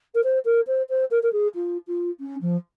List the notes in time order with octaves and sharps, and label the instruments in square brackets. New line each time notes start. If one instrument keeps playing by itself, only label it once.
[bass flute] A#4
C5
A#4
C5
C5
A#4
A#4
G#4
F4
F4
C#4
F3